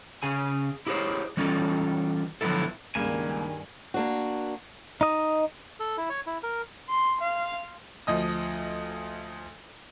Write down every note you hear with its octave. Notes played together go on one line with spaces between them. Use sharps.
C#3 G#4 G#5
E4 G4 G#4 A#4 C5 C#5
E3 G3 C#4 F4 A4
D3 F3 F#3 B3 E4 A4
C#2 G2 D#3 A#3 G#5 E7
A#3 D4 F#4
D#4 D#5
A4
E4
C#5
E4
A#4
C6
F5
D2 F3 D#5 D#6